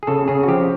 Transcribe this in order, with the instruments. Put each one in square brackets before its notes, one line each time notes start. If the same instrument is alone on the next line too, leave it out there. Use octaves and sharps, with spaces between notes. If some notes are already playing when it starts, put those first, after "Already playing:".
[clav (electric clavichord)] G#4
C#3 A4
C#3 G#4
F#4
F3 G4